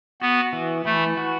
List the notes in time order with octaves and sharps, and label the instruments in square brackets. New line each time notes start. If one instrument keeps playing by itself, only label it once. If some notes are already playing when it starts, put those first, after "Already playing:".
[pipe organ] B3 [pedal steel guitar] F#4
[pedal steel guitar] E3
[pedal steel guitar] E3 [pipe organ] A3
[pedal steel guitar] F#4